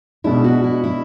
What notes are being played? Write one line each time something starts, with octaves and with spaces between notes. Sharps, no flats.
B2 G#3 D4 E4
F#4
E4
E4